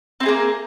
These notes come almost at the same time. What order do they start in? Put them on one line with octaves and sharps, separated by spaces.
C4 E4 G#4 A#3